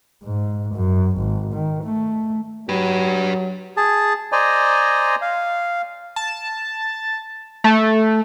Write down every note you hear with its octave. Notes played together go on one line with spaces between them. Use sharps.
G#2
F#2
G#1
D#3
A3
F#3 G4 B4
G#4 A5
C5 D5 D#5 G#5 A#5
F5
A5
A3